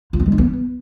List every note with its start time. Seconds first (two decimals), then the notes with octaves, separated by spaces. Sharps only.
0.13 F4
0.19 C4
0.26 G#3
0.32 D4
0.38 B3